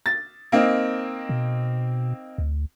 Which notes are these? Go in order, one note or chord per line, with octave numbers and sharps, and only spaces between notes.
A6
A#3 C4 D#4
B2
D2